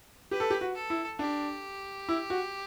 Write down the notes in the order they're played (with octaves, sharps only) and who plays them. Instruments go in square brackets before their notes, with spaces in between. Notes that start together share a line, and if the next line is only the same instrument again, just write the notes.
[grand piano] G4 [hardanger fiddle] B4
[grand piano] A4
G4
F#4
[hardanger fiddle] A4
[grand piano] E4
[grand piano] D4 [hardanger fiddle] G4
[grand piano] E4
F#4